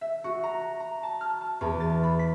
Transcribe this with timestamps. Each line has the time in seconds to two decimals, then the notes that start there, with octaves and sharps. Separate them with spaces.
0.01 E5
0.24 F#4
0.44 A#5
0.80 A#5
1.03 A5
1.21 F6
1.41 A5
1.61 E2
1.80 A6
2.03 B5
2.19 B6